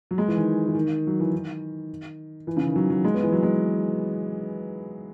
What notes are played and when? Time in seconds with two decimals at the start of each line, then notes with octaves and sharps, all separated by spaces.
0.11 F#3
0.18 G#3
0.28 E3
0.37 D#3
0.68 E3
0.75 D#3
1.07 F#3
1.20 E3
1.33 D#3
2.47 E3
2.57 C#3
2.66 D#3
2.76 F#3
2.90 F#3
3.04 G#3
3.14 B3
3.23 E3
3.32 F#3
3.43 G#3